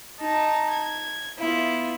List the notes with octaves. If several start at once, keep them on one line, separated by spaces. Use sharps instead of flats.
D#4 A5 A#5
G#6
B3 E4 F4